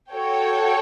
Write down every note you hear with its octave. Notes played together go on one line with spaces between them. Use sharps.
F#4 A4 C#5 G5